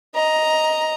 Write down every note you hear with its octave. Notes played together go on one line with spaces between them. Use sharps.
D#5 A#5